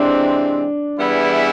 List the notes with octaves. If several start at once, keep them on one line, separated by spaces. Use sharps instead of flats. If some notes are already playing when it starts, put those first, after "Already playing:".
Already playing: C3 E3 G#3 C4 D4
E3 G3 B3 E4 G#4